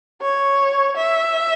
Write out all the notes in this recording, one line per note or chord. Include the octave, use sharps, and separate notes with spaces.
C#5
E5